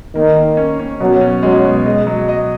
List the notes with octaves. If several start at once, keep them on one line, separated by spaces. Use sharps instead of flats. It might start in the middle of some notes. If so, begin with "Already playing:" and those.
D#3 A#3
A#3
C#4
C#4
B2 F#3
C#4
F#3 G#3
B2
G#3 D#5
F#3
D#5